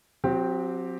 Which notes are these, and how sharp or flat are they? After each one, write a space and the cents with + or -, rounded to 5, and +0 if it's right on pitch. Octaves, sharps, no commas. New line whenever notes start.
F#3 -35 C4 +0 G4 +0